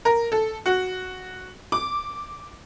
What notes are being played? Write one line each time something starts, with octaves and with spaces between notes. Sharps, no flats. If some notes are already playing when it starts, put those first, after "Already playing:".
A#4
A4
F#4
D6